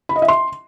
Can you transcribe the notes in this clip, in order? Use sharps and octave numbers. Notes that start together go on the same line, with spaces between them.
B5
D#5
E5
C6